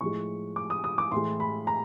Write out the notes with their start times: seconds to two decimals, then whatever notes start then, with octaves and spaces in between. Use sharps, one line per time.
0.01 A2 F3 G#3 C#6
0.56 D6
0.70 D#6
0.84 D#6
0.98 D6
1.12 A2 E3 G#3 C6
1.40 B5
1.67 A#5